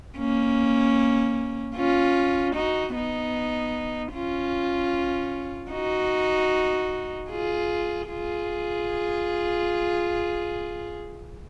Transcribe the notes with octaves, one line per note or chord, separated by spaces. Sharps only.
A#3 C#4
C#4 F4
D#4 F#4
B3 D#4
C#4 F4
D#4 F#4
F4 G#4
F4 G#4